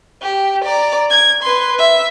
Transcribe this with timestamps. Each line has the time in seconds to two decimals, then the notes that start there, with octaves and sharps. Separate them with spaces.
0.22 G4
0.64 D5 A#5
1.10 G#6
1.43 B4 C6
1.78 E5